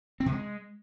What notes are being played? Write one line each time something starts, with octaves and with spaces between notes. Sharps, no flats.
C4
C3
G#3